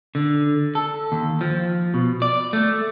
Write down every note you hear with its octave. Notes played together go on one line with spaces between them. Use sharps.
D3
A4
D#2
F3
B2
D5
A3